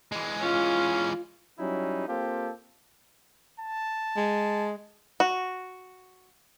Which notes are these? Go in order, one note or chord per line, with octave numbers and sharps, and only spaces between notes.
E3 G#3
C#4 F4
F#3 G3 C#4 D#4 E4
A#3 C4 F4 G4 A4
A5
G#3
F#4